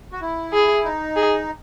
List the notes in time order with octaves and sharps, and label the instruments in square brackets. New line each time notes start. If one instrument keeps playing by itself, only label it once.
[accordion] F#4
E4
[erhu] G#4
[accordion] D#4
[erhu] G#4